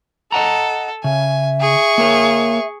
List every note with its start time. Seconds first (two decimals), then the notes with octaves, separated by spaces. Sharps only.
0.32 A4 D#5 F#5 A#5
1.04 C#3 E5 G#5
1.61 G#4 C#6
1.98 A#3 A#4 C#5